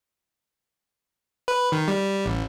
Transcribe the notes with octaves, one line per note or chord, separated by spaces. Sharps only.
B4
D#3
G3
A1